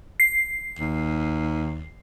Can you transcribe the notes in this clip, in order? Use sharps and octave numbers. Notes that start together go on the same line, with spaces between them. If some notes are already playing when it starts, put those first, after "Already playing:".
C7
D#2